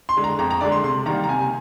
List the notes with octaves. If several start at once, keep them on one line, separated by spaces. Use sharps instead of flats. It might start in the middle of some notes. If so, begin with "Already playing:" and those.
C6
D3 G#3
A#5
F2 A#5
A#5
D3 G#3 D5
C6
C3 C6
D#3 G3 A#3 A#5
A#5
C3 G#5